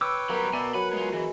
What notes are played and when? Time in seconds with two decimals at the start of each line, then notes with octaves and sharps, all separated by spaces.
0.01 B4 C#5 G5 D6 E6
0.29 F#3 G3 B3 A#4 F#5
0.53 B2 D5 E5 G#5
0.74 F#3 B4 F#5 G#5 B5
0.93 G#3 F4
1.13 E3 G#3